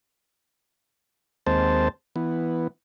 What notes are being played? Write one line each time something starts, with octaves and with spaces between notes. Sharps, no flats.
D#2 G#3 C4 C5 A5
E3 B3